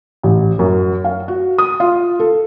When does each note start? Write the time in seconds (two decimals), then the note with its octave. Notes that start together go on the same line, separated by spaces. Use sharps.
0.23 A1
0.59 F#2
1.05 F5
1.28 F#4
1.58 D#6
1.80 F4
2.20 A4